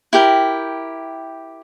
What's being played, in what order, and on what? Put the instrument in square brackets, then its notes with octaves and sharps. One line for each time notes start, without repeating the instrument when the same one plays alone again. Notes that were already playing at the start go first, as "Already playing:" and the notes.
[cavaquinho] E4 G4 A#4 G5